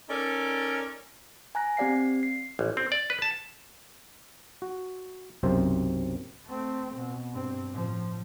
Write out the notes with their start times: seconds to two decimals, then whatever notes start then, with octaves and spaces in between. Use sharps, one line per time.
0.09 C#4 D#4 A4 A#4 D5
1.55 G#5 A#5 F#6 A#6
1.77 C4 G4 D5 F5 C7
2.23 C7
2.59 A1
2.77 C4
2.92 D5
3.10 B4
3.22 A5
4.62 F#4
5.43 B1 F#2 C3 C4 F4 C5
6.46 A3 C4
6.96 B2
7.32 G2 C4
7.70 A2 F3